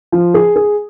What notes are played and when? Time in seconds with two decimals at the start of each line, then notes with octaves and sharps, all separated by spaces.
0.12 F3
0.34 G#4
0.56 G#4